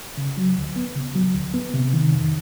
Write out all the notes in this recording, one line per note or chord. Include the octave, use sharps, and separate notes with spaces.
C#3
F#3
D2
B3
C#3
F#3
D2
B3
C3
D#3
F2